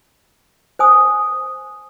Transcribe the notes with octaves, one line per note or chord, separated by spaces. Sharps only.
C5 G#5 D#6